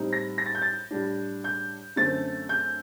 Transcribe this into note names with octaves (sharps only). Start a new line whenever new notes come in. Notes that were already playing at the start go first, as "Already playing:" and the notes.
Already playing: A2 G3 C4 D#4
A#6
A#6
A6
G6
A6
A2 G3 D4
G6
F#2 D3 A3 C4 A6
G6